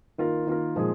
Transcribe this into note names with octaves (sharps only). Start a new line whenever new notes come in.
D#3 A#3 F4 A#4
D#3 A#3 F4 A#4
A#2 F3 G#3 D#4 G#4